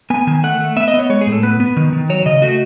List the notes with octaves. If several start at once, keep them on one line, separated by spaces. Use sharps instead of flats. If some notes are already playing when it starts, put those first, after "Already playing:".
B3 G#5
D#3 G#5
A3 F#5
A3
B3 E5
D#5
B3
C#5
G#3 C#5
G#4
A2
A4
B3 B4
B3
D#3
D#3
F#3 C#5
C#3 D#5
A3 F#4